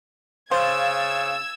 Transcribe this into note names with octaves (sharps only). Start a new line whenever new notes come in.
C#3 C5 F5 E6 G#6 A6